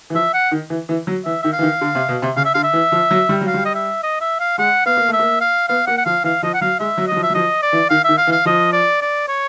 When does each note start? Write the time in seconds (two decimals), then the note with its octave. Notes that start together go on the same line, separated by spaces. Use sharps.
0.10 E3
0.14 F3 E5
0.34 F#5
0.51 D#3
0.70 E3
0.89 E3
1.07 F#3
1.25 E3 E5
1.43 D#3 E5
1.53 F5
1.59 E3
1.63 D#3
1.81 D3
1.95 C3
2.09 B2
2.22 C3
2.36 C#3 F5
2.45 E5
2.54 D3 F5
2.64 E5
2.73 E3
2.92 F3
3.11 F#3
3.29 G3
3.41 F#3
3.47 F5
3.54 G3
3.65 D#5
3.75 E5
4.03 D#5
4.21 E5
4.40 F5
4.58 G#3 F#5
4.85 B3 F5
4.97 A#3
5.08 A3 E5
5.19 A#3
5.41 F5
5.69 B3 F5
5.87 A#3 F#5
5.98 F#5
6.05 F3 F5
6.24 E3 F5
6.43 F3 D#5
6.54 F#5
6.61 F#3 F5
6.80 G#3 E5
6.97 F#3
7.08 F#3 D#5
7.16 F3
7.23 E5
7.30 F#3
7.35 F3 D#5
7.63 D5
7.73 E3
7.90 D#3 F5
8.05 D#3 E5
8.17 F5
8.27 E3
8.32 F5
8.45 F3 D#5
8.73 D5
9.02 D5
9.28 C#5